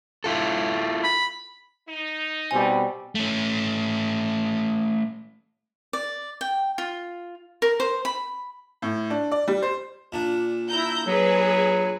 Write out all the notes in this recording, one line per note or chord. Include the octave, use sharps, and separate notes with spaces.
E4 F4 A4
B5
D#4
B2 G3 C4 G#5
A3 C#4
D5
G5
F4
A#4
C5
B5
A2
D4
D5
G3
C5
A#2 D4
E4 A#5 G6
F#3 G#4 B4